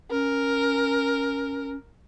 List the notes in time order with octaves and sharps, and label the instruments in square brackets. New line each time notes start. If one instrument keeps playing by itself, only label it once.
[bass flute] C#4 [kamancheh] A#4